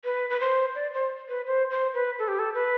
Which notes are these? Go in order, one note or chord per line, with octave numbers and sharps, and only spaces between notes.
B4
B4
C5
D5
C5
B4
C5
C5
B4
A4
G4
A4
B4